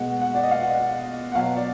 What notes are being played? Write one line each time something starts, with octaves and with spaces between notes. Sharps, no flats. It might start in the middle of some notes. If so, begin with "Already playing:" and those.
Already playing: B2 G#3 F#5
F#5
D5
D#5
F5
F#5
F#5
B2 F#3 F5
D5